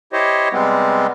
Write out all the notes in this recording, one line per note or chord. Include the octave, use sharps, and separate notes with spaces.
E4 G4 C5 C#5 D#5
C3 G3 G#3 B3 C4